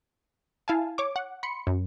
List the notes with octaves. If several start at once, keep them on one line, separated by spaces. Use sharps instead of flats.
E4 F5 G#5 A5
C#5 C#6 D6
F#5
B5 C6 C#7
F#2